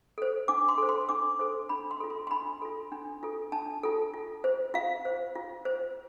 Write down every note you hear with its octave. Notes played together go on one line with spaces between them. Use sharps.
A4 C5
D4 D6
C6
A4 C5
C6
D4 D6
A4 C5
D4 B5
C6
F4 A4
C6
C6
D4 B5
F4 A4
D4
F4 A4
D4 A5
F4 A4
F4
C5
F4 F5
C5
F4
C5